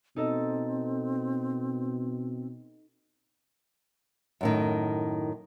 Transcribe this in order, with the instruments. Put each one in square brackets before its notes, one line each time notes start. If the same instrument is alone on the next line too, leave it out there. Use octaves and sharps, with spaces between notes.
[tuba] B2 [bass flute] C4 [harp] D#4 A4 D#5
[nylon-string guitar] F#2 A2 D#3